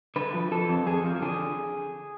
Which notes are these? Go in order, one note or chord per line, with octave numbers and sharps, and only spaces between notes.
D3 B4
F3
F3 A4
F2
F2 G#4
F3
D3 G#4